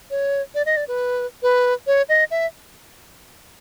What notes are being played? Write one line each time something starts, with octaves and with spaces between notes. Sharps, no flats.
C#5
D5
D#5
D5
B4
B4
C#5
D#5
E5